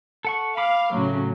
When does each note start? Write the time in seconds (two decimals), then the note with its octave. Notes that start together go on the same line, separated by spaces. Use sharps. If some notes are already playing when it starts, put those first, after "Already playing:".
0.25 A4 F#5 C#6
0.57 F5 B5 D6
0.94 A2 C#3 F#3